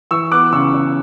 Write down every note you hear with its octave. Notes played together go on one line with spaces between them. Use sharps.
E3 C#6 E6
B3 D6 F#6
C#3 C#6 E6
C#3